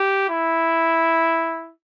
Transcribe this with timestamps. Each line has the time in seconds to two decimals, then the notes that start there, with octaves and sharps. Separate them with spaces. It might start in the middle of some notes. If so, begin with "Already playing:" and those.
Already playing: G4
0.30 E4